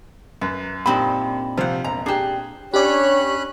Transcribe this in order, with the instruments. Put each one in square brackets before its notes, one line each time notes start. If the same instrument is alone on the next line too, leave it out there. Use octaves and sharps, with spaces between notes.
[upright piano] F#2 [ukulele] B4
[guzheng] A#2 C4 D4 [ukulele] D#4 G4 B5
[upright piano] C3 F3 C5 [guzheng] F5 F#5
[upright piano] E1 [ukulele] A#5
[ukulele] D4 G4 [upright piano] G#4
[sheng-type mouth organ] C#4 B5 F#6 [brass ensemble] D4 C#5 [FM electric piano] G4 D5